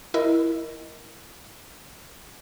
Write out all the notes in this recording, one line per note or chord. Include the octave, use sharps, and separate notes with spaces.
E4 A#4 D#5